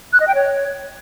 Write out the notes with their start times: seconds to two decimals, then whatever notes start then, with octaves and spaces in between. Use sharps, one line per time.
0.13 F#6
0.20 D#5
0.28 G5
0.35 C#5